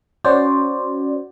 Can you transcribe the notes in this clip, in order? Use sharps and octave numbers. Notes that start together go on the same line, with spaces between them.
C#4 F#4 C5 D5